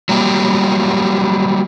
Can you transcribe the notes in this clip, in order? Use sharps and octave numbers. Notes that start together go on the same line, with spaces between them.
F#3 G3 A#3 G4